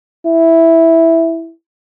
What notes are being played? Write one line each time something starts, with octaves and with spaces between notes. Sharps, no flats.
E4